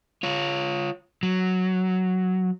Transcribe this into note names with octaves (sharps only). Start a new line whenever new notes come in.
F4 C#5
F#3